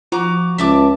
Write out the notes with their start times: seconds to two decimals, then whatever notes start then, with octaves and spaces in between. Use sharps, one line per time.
0.12 F3 F#4 A#5 D6
0.58 C#2 E5 A5 D6